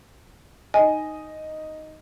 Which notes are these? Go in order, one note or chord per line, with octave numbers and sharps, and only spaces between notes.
D#4 D#5 G#5